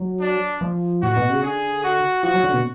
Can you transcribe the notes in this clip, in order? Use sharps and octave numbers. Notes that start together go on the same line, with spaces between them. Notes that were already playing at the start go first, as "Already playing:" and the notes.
Already playing: F#3
D4
F3
A2 F#4
B2
C#3
D3 G#4
F#4
F3 F#4
F#3
D3
B2